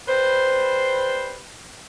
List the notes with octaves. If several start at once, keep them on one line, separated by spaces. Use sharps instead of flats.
G3 B4 C5